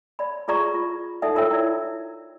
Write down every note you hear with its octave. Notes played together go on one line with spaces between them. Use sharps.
D5 B5
F4 G#4 D5 A#5 C#6
F4
D#4 A4 D5 E5 F#5
F4 A#4 C#5 E5 G5 E6
E4 D5